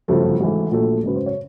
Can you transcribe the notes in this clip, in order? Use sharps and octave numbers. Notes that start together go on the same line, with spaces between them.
G1 F#2 C#3 F3 A3
G#1 G#2 E3 A3
A#1 A#2 F#3 A3
G#1 F#2 C#3 B4
C5
C#5